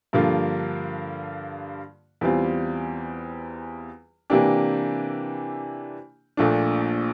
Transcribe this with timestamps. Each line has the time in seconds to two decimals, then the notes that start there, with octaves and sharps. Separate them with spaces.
0.13 G2 D3 F3 A#3 F4
2.21 E2 E3 G3 C4 F4
4.30 C3 E3 A#3 D4 G4
6.37 A#1 A#2 A3 D4